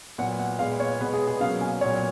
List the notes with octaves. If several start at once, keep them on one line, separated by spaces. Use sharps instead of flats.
A#2 F#3 B3 F#5
F#5
A#2 G#3 B3 F5
C#5
B2 G#3 B3 B4
G#4
G#4
B2 F#3 A#3 C#4 F5
G#5
A#2 F#3 B3 C#5